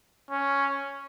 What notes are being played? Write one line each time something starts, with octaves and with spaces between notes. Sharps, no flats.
C#4